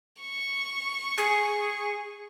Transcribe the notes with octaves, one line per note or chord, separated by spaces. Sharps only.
C#6
G#4